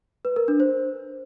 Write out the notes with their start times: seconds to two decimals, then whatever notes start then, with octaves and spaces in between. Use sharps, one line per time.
0.25 B4
0.36 A#4
0.48 D4
0.60 C5